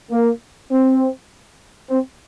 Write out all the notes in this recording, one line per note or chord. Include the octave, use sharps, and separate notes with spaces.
A#3
C4
C4